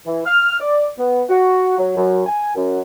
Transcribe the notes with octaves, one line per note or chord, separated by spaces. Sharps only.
E3
F6
D5
B3
F#4
F#3
F#2
G#5
F#2